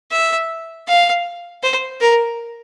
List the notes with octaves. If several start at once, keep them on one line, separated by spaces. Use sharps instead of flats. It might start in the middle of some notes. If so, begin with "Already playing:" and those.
E5
F5
C5
A#4